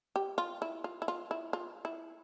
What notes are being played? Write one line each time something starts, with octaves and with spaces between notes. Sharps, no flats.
G4
F4
E4
F4
E4
F4
E4
F4
E4